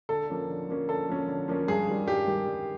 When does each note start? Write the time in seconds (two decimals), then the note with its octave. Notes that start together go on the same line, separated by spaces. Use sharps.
0.09 D3 A4
0.30 F3 A#3 C#4
0.49 D3
0.68 F3 A#3 C#4
0.89 D3 A4
1.09 F3 A#3 C#4
1.28 D3
1.48 F3 A#3 C#4
1.68 G2 G#4
1.88 D#3 G3
2.07 G2 G4
2.27 D#3 G3
2.47 G2